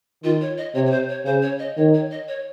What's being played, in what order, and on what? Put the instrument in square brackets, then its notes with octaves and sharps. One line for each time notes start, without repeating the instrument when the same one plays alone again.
[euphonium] D#3 [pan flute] F4
[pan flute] C#5
D#5
[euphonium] C3 [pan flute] C#5
[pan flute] C#5
C5
C#5
[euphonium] C#3 [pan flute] C5
[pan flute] C#5
D#5
[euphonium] D#3 [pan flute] C#5
[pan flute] C#5
D#5
C#5